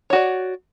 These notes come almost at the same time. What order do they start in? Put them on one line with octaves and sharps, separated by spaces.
C#5 F#4 D5